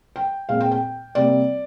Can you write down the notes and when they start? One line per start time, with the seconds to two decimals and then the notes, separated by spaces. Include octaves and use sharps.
0.16 G5
0.49 A#2 G#3 C4 F5
0.60 G5
0.72 G5
1.15 C3 G3 A#3 D5